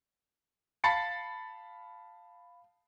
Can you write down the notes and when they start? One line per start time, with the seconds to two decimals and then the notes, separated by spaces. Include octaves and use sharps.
0.84 F5 A5 B5 A6 C7 C#7